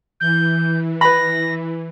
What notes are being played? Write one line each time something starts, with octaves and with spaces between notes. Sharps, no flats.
E3 G6
B4 B5 A#6